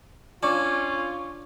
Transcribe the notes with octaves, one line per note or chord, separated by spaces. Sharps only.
C#4 D4 F4 C#6